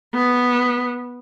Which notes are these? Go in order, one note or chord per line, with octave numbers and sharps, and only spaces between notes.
B3